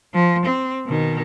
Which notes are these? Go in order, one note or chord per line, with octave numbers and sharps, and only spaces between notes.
F3
C4
B2 D#3